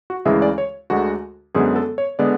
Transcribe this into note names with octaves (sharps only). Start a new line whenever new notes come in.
F#4
D2 C#3 E3 G#3 E5
D5
C#5
D2 D3 G#3 F#4
F#2 D3 G#3 B3 G#4
A4
C#5
D3 G#3 B3 D5